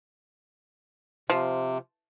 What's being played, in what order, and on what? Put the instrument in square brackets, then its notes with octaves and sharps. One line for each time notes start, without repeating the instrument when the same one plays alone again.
[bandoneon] C3 [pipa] F3